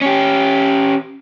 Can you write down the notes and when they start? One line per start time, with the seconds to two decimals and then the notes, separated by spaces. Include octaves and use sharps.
0.01 C#4 G4